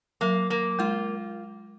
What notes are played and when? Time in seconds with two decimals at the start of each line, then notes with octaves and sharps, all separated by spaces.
0.21 F#3 A#3
0.50 A#3
0.79 G#3 F4